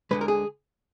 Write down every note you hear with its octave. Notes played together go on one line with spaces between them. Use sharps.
D2 D3 G#3 B4
A#4
G#4